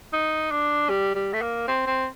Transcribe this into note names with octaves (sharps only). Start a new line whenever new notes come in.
D#4
D4
G3
G3
A3
A#3
C4
C4